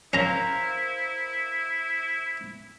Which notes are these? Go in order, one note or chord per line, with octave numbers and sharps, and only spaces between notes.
C#4 E4 A#4 C5 F5 A#5